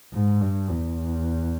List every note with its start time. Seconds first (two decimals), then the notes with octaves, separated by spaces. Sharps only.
0.13 G#2
0.41 G2
0.70 E2